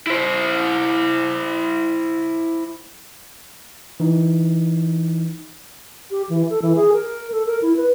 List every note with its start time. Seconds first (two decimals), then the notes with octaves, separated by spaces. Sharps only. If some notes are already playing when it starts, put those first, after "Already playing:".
0.07 E4 C5
4.00 E3 D#4
6.11 G4
6.29 E3
6.50 A4
6.62 E3
6.76 G#4
6.93 A#4
7.32 A4
7.47 A#4
7.62 E4
7.76 B4